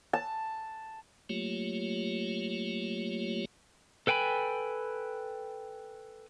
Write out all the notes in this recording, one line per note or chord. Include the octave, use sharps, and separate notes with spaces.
A5
F#3 A3 A#3 F4 G4 C#5
A4 B4 G5 G#5 B5